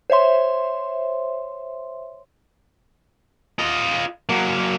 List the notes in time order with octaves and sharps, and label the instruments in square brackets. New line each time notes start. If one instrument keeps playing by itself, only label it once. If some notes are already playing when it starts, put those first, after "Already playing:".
[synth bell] C5 C#5 E5 C6
[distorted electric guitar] F4 D#5
F#3 A#3